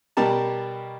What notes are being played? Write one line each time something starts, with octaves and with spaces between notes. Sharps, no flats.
B2 G3 G4 A#4 A5